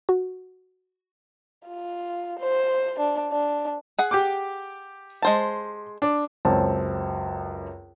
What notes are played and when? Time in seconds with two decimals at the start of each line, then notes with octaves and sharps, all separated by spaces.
0.09 F#4
1.68 F4
2.39 C5
2.99 D4
3.32 D4
3.99 G#4 F#5
4.11 G4 G5 D6
5.22 G#3 C5 A5
6.02 D4
6.45 C#2 F#2 C4 C#5 A5